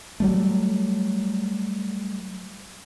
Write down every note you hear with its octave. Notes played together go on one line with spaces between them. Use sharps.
F#3 G3 A3